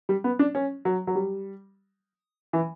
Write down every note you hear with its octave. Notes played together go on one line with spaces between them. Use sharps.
G3
B3
D4
C#4
F#3
F#3
G3
E3